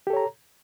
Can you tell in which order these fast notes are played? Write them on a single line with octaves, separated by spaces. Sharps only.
G4 A4 C#5 A#5